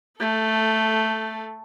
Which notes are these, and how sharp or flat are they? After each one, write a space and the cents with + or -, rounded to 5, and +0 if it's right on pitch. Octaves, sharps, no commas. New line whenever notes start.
A3 +5 A4 -10